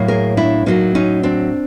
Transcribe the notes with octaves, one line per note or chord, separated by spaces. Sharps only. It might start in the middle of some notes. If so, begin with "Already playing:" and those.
Already playing: A2 F#3 A#3
G#4 A#4
D4 E4
A2 F#3 A#3 C#4 D#4
C#4 D#4
C4 D4